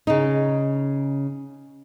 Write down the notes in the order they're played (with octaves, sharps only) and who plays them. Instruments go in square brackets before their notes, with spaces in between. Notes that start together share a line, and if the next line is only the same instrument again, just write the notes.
[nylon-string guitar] C#3 D#4